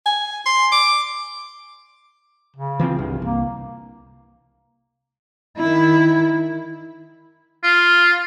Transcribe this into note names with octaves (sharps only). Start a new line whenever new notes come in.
G#5
C6
D6
C#3
E3 F3 C4
C2 G2
C2 A#3
D#3 E4
F4